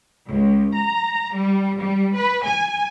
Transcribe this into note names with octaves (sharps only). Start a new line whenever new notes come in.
C#2
A#5
G3
G3
B4
G#5